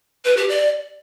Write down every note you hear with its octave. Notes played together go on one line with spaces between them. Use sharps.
B4
G4
D5